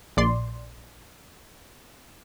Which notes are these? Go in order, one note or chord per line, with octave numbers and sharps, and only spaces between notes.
A#1 D5 C6